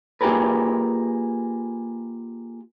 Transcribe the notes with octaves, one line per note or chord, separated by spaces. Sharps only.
A#3 F4 G4 G#4 A#4 B4